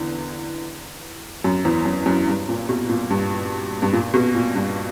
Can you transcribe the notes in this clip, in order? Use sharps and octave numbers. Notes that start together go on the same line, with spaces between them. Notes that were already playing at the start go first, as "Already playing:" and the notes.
Already playing: E2 D3
F#2
E2
F#2
F#2
G2
A#2
B2
A#2
G2
G2
A#2
B2
A#2
G2